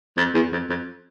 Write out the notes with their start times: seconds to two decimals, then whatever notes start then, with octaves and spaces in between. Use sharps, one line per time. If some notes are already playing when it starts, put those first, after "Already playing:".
0.17 F2
0.34 E2
0.52 F2
0.69 F2